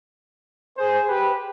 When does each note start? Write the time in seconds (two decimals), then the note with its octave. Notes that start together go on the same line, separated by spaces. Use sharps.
0.77 G#4 C5
1.08 G4 B4